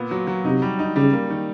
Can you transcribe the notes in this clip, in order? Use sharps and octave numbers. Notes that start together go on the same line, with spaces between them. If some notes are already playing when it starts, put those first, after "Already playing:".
Already playing: A#2 B3
F#3
F#3
C3 D#4
G3
D#4
C#3 G3
A#3
D#3